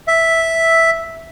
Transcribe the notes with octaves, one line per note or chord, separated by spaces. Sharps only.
E5